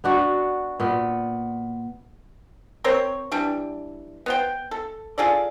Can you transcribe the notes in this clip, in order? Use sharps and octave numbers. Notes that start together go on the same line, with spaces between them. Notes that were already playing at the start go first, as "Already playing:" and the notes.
B3 D4 F#4
A#2 B3
C4 A#4 C5 C#5
E3 G3 D4
B3 C5 G5
A4
F4 G#4 A4 D5